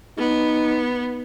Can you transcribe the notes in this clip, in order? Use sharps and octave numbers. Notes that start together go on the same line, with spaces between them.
B3 D#4